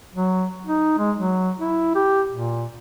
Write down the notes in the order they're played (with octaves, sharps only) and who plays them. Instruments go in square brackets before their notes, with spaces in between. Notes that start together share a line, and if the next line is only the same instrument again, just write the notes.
[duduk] F#3
D#4
G#3
F#3
E4
G4
A#2